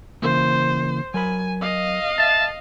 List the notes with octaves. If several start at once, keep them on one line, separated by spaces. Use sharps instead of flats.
C#3 E3 A#3 C5
F#3 A#4 G#5 B5
D#5 F5
E5 A5